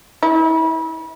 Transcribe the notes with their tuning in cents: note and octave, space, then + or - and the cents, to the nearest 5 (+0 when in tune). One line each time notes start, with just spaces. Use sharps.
E4 -35